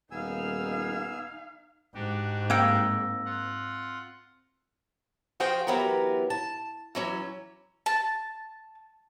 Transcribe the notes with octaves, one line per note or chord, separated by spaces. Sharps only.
D#1 B3 D#4 F5 G#5 E6
G#2 D4 F#4 G4
A#3 C4 G5 E6 A#6
F4 F#5
F3 F#4 G#4 C5 F5 G5
E3 F#3 B3 G4 A#4
A5
E3 F#3 C#4
A5